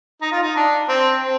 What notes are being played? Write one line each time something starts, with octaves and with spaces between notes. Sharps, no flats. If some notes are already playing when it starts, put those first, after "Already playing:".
D#4
F4
D#4
D4
C4
C4